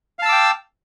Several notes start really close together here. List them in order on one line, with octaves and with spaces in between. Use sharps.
F5 A5 E6 D6 G5